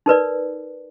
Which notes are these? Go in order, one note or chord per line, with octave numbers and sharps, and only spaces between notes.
D#4 A#4 B4 D5